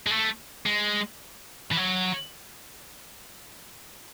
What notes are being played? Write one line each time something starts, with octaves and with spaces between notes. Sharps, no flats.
G#3
A3
G#3
E3
F#3